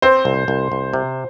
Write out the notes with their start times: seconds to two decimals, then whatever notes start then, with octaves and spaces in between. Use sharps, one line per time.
0.02 C4 C5
0.25 C2
0.48 C2
0.72 C2
0.94 C3